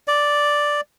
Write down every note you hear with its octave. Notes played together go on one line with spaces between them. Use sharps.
D5